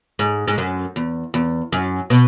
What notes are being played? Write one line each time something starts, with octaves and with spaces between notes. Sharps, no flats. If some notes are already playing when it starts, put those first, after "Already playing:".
G#2
G#2
F#2
E2
E2
F#2
B2